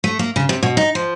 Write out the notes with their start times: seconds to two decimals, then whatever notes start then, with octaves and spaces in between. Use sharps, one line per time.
0.04 A3
0.19 A#3
0.36 C#3
0.49 C3
0.63 B2
0.77 D#4
0.95 F3